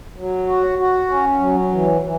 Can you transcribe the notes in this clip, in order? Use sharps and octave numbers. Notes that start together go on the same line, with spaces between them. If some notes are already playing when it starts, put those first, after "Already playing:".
F#3
F#4
F#4
C#4
F#3
E3
E3